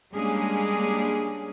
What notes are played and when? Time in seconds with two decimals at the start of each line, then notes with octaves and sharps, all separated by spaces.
0.14 G3 G#3 A#3 C#4 D4 G#4